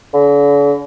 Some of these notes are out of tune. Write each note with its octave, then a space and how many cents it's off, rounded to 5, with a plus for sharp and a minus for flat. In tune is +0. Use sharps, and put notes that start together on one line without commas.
D3 -45